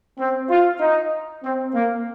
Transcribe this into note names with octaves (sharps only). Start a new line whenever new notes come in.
C4
F4
D#4
C4
A#3